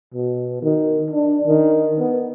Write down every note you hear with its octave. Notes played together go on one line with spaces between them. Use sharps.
B2
D#3
D4
D#3
B3